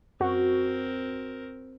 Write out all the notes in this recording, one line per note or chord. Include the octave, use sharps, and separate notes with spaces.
F#2 C4 F#4 A#4